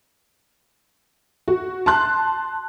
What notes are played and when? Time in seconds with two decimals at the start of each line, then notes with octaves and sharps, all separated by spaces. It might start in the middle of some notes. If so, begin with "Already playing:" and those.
1.48 F#4
1.86 A5 C6 F#6